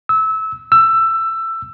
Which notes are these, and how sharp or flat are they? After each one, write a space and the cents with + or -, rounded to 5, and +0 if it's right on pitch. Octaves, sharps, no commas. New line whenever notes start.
E6 -25
E6 +15